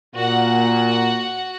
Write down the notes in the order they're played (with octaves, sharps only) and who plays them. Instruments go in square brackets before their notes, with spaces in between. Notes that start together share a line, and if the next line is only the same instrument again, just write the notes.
[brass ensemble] A#2 [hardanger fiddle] F#4 F#5